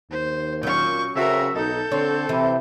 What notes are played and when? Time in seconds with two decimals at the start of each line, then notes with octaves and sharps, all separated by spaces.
0.11 D#2 C5
0.63 A#2 F#3 C#4 C#6 G6
1.16 C#3 C4 F#4 A4 A#4 E5
1.55 B1 D#4 A4 G6
1.92 D3 C4 C#5
2.29 C3 E3